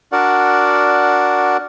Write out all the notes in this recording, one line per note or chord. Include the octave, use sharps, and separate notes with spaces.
D4 F#4 A#4 D5 F#5